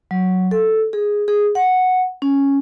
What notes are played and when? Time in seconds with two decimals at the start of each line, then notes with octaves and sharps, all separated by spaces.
0.11 F#3
0.51 A4
0.93 G#4
1.28 G#4
1.55 F#5
2.22 C#4